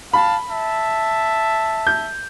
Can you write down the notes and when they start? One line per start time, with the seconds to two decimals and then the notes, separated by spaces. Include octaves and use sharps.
0.13 F5 A5 B5
0.49 E5 A5
1.87 G6